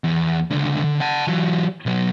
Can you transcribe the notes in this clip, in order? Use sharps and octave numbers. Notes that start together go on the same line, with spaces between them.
E2
C#2 D3
D3
F#5 A5
E3 F#3
B2 F#3